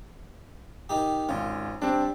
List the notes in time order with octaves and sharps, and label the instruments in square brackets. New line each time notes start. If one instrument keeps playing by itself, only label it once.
[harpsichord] D#3 D#4 G4
[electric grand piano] G#1 C#4 [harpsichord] F4
[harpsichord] G3 [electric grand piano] C4 D4